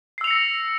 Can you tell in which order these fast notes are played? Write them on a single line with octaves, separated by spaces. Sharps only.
C7 E6 F7 C#7 A#6